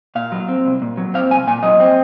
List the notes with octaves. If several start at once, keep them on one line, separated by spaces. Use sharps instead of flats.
A#2 F5
F#3
C4
C2
A#2
F#3
C4 F5
C2 G#5
A#2 G#5
F#3 D#5
C4